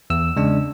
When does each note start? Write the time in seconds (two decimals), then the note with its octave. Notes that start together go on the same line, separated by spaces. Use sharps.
0.10 E2 E6
0.37 C#3 G#3 D4